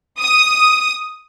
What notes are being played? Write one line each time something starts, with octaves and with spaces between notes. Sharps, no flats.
D#6